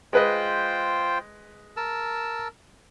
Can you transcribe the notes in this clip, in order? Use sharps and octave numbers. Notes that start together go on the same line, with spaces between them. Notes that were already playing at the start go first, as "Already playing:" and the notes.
G#3 F4 B4 C5 D#5 G5
A#4 A5 E6